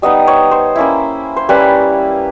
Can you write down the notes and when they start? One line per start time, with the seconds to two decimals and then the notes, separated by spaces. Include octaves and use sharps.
0.02 G3 B3 D#4 D#5
0.28 C#5
0.51 C5
0.76 A#3 C#4 E4
1.36 C5
1.49 G3 A#3 C#4 B4